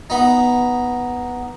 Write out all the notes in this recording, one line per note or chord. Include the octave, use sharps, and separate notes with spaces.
B3 D#4